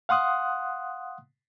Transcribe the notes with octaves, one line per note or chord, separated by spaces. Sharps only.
F5 F#5 C6 D#6 F#6